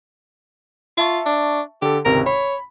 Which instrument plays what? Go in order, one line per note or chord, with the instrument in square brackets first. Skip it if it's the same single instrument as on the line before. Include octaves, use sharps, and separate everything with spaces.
[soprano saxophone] F4 [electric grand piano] E5 A5 C#6
[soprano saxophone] D4
[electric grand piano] D3 A4 [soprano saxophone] G4
[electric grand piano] G#1 C#2 C3 [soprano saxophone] A#4
[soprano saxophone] C#5 [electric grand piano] B5